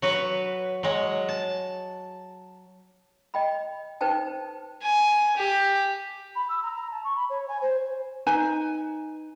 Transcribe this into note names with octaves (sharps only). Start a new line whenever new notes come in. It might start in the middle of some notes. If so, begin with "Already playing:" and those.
F#3 F#4 B4
F#3 G#3
A5
D#5 G5 B5
D#4 B4 C5 G5 A5
G#5
G4
B5
E6
A#5
A#5
A5
C#6
B5
C#5
G#5
C5
D#4 B4 G#5